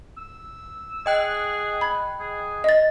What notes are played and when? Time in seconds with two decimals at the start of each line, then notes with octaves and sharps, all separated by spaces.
0.17 E6
1.06 G#4 D#5 G5 F#6
1.81 B5 G#6
2.20 G#4
2.64 D#5 A6